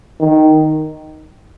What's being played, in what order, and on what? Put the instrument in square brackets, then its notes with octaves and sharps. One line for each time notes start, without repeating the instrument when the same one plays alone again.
[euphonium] D#3